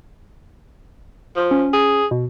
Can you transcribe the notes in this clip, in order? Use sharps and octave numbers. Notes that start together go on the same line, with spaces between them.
F3
C#4
G#4
B2